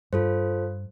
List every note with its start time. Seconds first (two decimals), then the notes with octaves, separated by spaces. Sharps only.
0.13 G2 F4 A4 C5